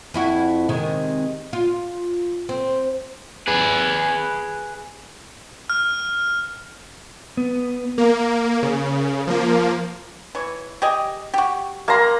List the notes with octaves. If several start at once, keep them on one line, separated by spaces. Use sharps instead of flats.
F2 E4 F#4
C3 D#3 G#3
F4
C4
G#4 B4
F6
B3
A#3 A#4
C#3
F3 A#3
E3 C#5
G4 G#4 D#5
F#4 G4
A#3 C#5 A5 A#5 C6